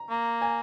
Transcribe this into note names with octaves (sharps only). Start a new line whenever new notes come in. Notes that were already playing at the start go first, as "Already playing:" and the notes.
Already playing: A#5
A#3
G#5